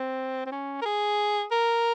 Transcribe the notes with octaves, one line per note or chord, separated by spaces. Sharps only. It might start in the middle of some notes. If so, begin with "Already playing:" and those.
Already playing: C4
C4
C#4
A#4
G#4
A#4